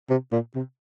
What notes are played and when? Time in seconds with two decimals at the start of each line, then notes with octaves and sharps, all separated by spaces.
0.10 C3
0.32 A#2
0.55 C3